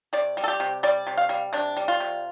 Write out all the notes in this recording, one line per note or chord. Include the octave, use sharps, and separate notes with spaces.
C3 D5
G3
A4
G4
C3
G3 D5
C3
F5
G3
C3 D4
G3
F4
C3